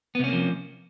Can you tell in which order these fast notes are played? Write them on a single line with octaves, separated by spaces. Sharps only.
B3 C3 C#4 A#3 F3